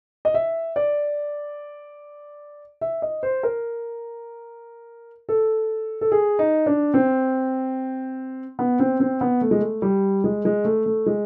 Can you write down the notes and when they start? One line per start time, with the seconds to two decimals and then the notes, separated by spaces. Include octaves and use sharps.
0.25 D#5
0.34 E5
0.76 D5
2.81 E5
3.02 D#5
3.23 C5
3.43 A#4
5.29 A4
6.01 A4
6.12 G#4
6.39 D#4
6.66 D4
6.94 C4
8.59 B3
8.79 C4
9.00 C4
9.21 B3
9.41 A3
9.51 G#3
9.59 A3
9.82 G3
10.24 G#3
10.45 G#3
10.65 A3
10.86 A3
11.06 G#3